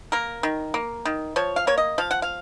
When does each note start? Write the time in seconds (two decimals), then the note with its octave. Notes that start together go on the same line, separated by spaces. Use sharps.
0.12 A#3 A#4
0.43 D#3
0.74 A#3
1.05 D#3
1.36 F3 C#5
1.56 F5
1.67 A#3 C#5
1.78 D#5
1.98 F3 F5
2.11 F#5
2.22 F5